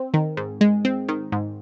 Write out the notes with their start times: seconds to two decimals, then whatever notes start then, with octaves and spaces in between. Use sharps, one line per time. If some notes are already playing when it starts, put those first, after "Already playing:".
Already playing: C4
0.14 D#3
0.37 G#2
0.61 G#3
0.85 C4
1.09 D#3
1.32 G#2